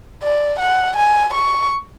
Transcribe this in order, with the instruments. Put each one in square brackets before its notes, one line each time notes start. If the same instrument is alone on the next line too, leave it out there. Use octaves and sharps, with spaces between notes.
[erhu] D5
F#5
G#5
C#6